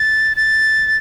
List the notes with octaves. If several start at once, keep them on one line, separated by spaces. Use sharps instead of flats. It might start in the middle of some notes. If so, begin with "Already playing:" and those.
Already playing: A6
A6